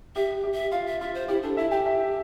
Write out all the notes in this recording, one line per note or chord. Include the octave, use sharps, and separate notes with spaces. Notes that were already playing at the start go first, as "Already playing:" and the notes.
G4 E5
G4
E5
F4 F5
E5
F4 E5
C5
E4 G4
D4 A4
E4 E5
G4 G5
E5